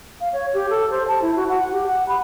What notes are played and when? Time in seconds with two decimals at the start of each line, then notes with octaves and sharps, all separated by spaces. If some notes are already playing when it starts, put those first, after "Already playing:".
0.21 F5
0.33 C#5
0.54 G4
0.70 A4
0.91 C5
1.08 A5
1.22 E4
1.36 F#4
1.48 F#5
1.72 G4
1.87 F#5
2.09 B5